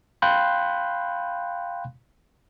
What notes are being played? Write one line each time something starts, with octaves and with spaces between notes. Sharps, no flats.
F5 G5 B5 C6 F#6 G6